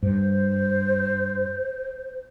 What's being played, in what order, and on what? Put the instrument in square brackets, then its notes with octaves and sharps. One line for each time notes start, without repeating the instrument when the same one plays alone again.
[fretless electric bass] G2 [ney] C5